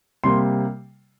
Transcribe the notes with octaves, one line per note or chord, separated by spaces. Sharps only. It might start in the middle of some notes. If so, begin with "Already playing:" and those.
C3 G3 A#3 C6